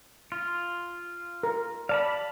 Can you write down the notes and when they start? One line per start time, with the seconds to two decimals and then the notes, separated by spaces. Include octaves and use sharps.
0.32 F4
1.43 A#4
1.89 D5 F5 A5 B5